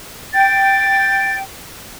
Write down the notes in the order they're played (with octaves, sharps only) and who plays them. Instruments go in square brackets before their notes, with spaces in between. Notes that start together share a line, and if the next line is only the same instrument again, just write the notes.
[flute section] G5 [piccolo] A6